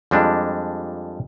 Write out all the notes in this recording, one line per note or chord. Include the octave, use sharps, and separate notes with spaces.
F2 G3 G#3 D4